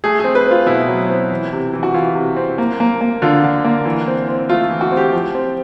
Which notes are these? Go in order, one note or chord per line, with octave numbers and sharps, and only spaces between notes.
A3 G#4
C4 G#4
B4
C4
F4
B2 E4
F#3
C4
E3
C3
E3
F#4
E3 F4
C3
C4
A#3
A#3
A#3
D3 F4
D3
A#3
E3
C4
C4
A3 F4
E3
F#4
C4
G4
F3
C4